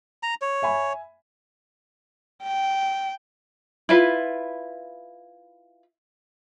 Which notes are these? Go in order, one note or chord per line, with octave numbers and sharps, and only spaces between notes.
A#5
C#5
E5 G#5 B5
G5
E4 F4 B4